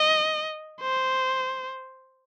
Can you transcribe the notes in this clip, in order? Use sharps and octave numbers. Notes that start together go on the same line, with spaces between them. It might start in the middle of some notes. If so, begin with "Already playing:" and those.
Already playing: D#5
C5